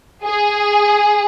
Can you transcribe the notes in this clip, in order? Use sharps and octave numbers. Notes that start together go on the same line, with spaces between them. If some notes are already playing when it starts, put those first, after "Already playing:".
G#4